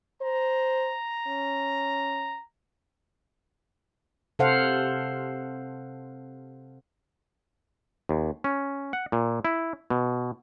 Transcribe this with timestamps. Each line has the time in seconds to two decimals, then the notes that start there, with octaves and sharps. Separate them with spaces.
0.22 C5 A#5
1.27 C#4
4.39 C3 A4 C5 F5 F#5
8.09 D#2
8.44 C#4
8.93 F#5
9.12 A#2
9.45 E4
9.90 B2